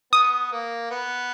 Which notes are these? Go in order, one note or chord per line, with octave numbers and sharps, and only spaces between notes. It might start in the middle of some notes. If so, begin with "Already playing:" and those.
B3 D#6
A#3
B3